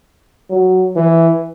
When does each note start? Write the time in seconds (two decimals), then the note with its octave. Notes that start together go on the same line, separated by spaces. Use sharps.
0.50 F#3
0.96 E3